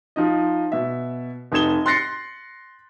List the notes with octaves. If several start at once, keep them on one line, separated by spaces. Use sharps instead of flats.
F3 D#4 D#5
B2 E5
F1 D#4 D#6 G#6 E7 G7
C6 F#6 A6 A#6 C7 C#7